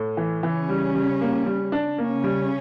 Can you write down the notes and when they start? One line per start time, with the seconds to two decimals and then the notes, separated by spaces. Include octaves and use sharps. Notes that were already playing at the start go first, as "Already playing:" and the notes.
Already playing: A2
0.17 E3
0.43 C#3 E3 C#4
0.69 G3
0.95 G3
1.21 A#3
1.46 G3
1.72 D4
1.98 C#3 A#3 C#4
2.24 G3